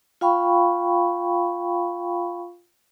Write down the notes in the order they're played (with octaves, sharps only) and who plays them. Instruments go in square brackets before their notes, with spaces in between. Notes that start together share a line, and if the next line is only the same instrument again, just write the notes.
[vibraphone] F4 F5 G5 B5 C#6